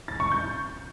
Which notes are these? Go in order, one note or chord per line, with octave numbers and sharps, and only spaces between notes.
A6
C#6
G6